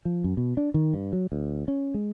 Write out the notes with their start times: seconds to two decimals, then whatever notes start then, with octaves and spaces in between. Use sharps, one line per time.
0.05 F3
0.24 F#2
0.37 B2
0.57 D4
0.74 D#3
0.94 G2
1.13 F#3
1.32 D2
1.68 C#4
1.94 G#3